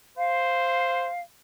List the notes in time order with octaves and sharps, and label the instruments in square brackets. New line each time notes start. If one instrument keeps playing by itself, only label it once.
[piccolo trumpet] C5 [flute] F5